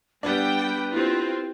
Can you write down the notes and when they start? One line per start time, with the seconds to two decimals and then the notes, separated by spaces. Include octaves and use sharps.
0.23 G3 B3 D4 B4 G5
0.92 C4 E4 F4 G4